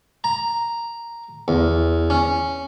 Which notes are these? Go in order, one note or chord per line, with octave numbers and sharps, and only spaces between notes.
A#5
E2
C#4